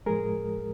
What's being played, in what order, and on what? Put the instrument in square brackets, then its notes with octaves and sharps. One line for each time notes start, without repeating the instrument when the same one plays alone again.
[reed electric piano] A2 F3 G#3 G#4 A#4